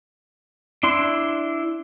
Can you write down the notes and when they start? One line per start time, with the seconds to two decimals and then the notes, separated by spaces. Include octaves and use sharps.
0.83 D4 E4 C6